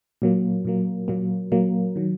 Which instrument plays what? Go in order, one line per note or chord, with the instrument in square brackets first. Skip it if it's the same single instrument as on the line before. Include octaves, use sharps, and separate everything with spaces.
[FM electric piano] A#2 F#3 A#3
A#2 F#3 A#3
A#2 F#3 A#3
A#2 F#3 A#3
D#3 F#3